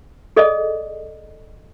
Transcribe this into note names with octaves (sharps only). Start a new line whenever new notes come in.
G#4 A4 D5 D#5